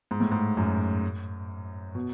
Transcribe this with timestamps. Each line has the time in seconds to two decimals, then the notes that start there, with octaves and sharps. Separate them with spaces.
0.11 G#2
0.20 A2
0.32 G#2
0.57 F#2
1.95 B2